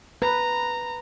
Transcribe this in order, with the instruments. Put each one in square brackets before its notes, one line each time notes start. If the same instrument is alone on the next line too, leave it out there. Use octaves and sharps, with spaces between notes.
[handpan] B4 [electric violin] A#5